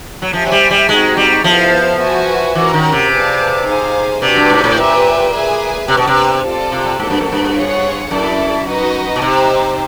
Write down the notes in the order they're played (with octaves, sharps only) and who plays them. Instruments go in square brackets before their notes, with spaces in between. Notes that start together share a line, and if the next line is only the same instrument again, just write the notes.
[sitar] F#3
[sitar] F3 [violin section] G4 C5 E5 G#5
[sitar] F#3
G3
G3
[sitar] G#3 [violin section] C4 D#4 F#4
[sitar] G3
[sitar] F3 [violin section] B3 E4 A4 C5 F5
[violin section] F#4 B4 E5 G#5
[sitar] E3 [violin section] C#4 F#4 A#4
[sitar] D#3
C3
[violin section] G#4 B4 D5 F5 A5
D#4 G#4 C5 F5 G#5
[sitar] C3 [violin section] D4 F#4 B4 D5
[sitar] G2
G#2
A2
[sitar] A#2 [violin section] G4 B4 E5 G5
[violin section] G#4 B4 E5 G#5
[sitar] C3 [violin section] B3 D4 G4
[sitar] B2
C3
[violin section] C4 F4 A4 D5
[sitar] C3
[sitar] G#2 [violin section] A#3 D4 F#4 A4
[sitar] G2
F#2
G2
[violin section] F4 G#4 C#5 F#5
[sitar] F#2 [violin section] E4 A4 D5
[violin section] D#4 F#4 B4 D#5
[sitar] B2
[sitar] C3 [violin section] D#4 G4 C5